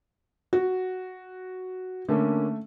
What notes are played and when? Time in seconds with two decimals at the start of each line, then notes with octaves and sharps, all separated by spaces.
0.53 F#4
2.08 D3 A3 A#3 C#4